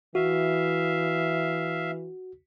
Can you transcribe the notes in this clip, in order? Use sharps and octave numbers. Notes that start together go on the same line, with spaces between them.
E3 F#4 E5 F5